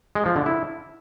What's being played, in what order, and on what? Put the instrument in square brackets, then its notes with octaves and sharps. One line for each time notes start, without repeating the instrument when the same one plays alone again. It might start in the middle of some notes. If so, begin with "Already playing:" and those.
[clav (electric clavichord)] G#3
F3
D3
E4